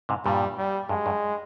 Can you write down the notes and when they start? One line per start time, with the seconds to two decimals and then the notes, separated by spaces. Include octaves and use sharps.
0.09 G#2 C3
0.25 G2 A#2 G3
0.58 G3
0.89 G2 G#3
1.06 G2